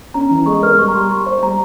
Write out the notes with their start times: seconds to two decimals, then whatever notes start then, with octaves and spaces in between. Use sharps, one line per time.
0.14 C#4 A#5
0.31 E3
0.46 G#3 C#6
0.62 A#4 F6
0.78 G3 C#6
0.88 A#5
0.94 G3 C6
1.10 G4 C#6
1.26 C5
1.42 G3 A#5